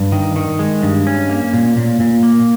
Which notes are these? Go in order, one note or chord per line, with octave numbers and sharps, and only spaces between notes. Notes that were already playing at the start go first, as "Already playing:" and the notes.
Already playing: G2
D#3
D#3
G#3
G2
C#4
A#3
A#2
A#2
A#2
A#3